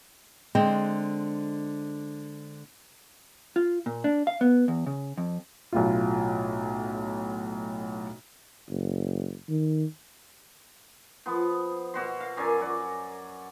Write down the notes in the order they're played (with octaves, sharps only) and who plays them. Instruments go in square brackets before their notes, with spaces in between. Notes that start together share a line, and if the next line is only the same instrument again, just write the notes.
[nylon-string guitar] D3 G#3 C4
[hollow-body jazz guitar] F4
A#2
D4
F5
B3
E2
C#3
F2
[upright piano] B1 A2 F4
[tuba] F#1
D#3
[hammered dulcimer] F3 B3
B2 F#4 C6
F5
F#2 A#4 D5 G#5
F#4 D5